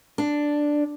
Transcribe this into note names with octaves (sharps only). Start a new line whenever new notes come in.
D4